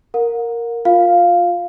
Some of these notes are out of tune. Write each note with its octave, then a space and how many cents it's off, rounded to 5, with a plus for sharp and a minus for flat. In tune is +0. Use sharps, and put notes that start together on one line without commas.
A#4 +0 F#5 -40
F4 +20 F5 +0